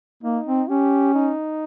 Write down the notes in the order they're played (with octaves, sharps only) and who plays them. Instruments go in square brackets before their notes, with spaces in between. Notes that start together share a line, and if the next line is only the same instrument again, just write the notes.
[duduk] A#3 [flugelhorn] D#4
[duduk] C4
[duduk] C#4 [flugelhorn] G4
[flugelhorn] D#4